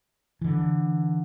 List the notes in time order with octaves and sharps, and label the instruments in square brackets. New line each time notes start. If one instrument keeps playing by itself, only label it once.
[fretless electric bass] D3 E3